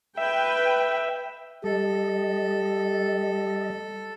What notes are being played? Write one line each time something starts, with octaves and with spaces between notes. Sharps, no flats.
B4 E5 G5
G3 G4 A4 D#5